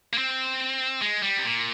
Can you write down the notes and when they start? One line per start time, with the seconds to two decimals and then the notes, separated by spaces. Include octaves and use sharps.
0.13 A#3
0.18 C4
1.02 G#3
1.23 G3
1.38 C3
1.44 A#2